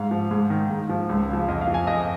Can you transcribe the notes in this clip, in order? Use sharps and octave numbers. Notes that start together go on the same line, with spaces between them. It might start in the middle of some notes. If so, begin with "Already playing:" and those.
Already playing: G#2 F5
F3
G#2
D#3
G#2
F3
C#2
C#3 F3
F2 D#5
F5
F3
G#5
F2 D#5